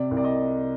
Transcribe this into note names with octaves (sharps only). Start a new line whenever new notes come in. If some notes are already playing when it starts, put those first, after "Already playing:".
Already playing: C3 D5
C2
D5
D#5